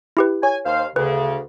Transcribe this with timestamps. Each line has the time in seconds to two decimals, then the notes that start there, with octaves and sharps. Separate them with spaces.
0.17 E4 G4 B4
0.43 C#5 G#5
0.66 D#2 C5 F5
0.96 D2 C#3 B4